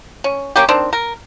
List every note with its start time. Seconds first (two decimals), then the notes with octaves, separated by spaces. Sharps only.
0.24 C#4
0.56 A#3 C#4 G4
0.69 D#3 C4 D4
0.93 A#4